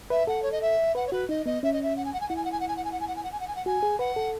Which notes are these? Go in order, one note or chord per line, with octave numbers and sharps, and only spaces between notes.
B4 E5
A4 F#5
C#5
D#5
E5
B4 F#5
C#5
F#4 B4
D#4 D#5
B3 D#5
C#4 E5
D#5
E5
F#5
G#5
F#5
G#5
E4 F#5
G#5
F#5
G#5
F#5
G#5
F#5
G#5
F#5
G#5
F#5
G#5
F#5
G#5
F#5
G#5
F#5
F#4 G#5
G#4
B4 F#5
A4